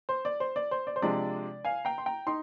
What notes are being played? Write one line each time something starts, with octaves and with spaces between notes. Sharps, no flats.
C5
D5
C5
D5
C5
D5
C5
C3 F3 G#3 D4 D5
F5 G#5
G5 A#5
C6
G5 A#5
D#4 C6